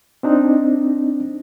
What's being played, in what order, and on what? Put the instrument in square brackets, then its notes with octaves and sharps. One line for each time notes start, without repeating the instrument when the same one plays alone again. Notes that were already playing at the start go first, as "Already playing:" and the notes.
[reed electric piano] C4 D4 D#4